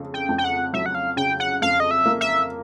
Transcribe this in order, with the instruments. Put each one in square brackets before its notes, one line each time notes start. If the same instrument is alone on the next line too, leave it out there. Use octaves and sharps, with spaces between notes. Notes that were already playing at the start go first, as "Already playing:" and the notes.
Already playing: [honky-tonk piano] F2 C#3
[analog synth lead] G5
[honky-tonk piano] F2
[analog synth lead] G5
F#5
[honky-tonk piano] F#3 [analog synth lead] E5
[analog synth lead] F#5
F5
[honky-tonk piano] C#3 [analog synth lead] G5
[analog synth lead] F#5
[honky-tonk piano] F2 [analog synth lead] F5
[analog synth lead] D#5
E5
[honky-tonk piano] A#3
[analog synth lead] E5